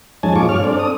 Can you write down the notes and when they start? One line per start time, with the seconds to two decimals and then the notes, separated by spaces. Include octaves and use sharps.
0.23 F2 G#3 C#4 D#4 G#5 A5
0.35 A#2 F3 F4 G#4 C#6 D6
0.49 G2 C#5 F6
0.64 C4 D4 A4 D5
0.79 D#6